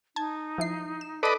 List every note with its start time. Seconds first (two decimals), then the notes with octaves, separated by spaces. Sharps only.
0.16 D#4 A5 G#6
0.58 F3 E4 C7
1.01 E7
1.23 A4 B4 D5 D#5 B5